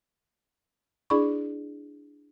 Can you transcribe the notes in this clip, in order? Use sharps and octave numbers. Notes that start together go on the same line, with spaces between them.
D4 E4 G#4 D5 B5 C#6